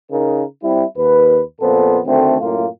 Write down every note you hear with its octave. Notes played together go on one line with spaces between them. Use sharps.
C#3 D#4 A#4
G3 C4 E4
D#2 B4
F2 A#2 B3 A4 C5
D2 D#3 A3 C4
F#2 A2 A#3 F4